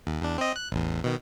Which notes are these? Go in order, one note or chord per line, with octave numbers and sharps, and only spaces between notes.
D#2
E2 D4
C4 D#5
F#6
A1 E2
B2 D#3